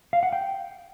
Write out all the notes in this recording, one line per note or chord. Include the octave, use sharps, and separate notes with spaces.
F5
F#5
G5